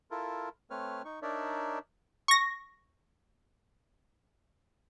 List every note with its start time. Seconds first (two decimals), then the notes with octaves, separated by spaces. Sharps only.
0.11 E4 F4 A4 A#4
0.70 A3 C4 B4 C#5 F6
1.05 D#4 C#6
1.22 D4 D#4 A#4 C#5 D5 E5
2.28 C#6 A#6